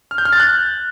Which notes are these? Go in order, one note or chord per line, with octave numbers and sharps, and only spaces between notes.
F6
G6
F6
A6
F#6